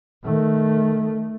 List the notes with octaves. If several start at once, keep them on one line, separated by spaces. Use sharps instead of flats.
D#3 A3